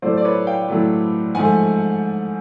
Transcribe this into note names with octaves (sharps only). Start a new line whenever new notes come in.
A2 F#3 A3 C5 D5
D5
B4 C#5
F5 G5
A2 F#3 A3
G#2 F3 A3 F#5 G#5